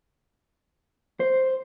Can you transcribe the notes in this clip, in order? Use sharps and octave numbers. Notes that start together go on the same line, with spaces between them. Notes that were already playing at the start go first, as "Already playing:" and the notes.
C5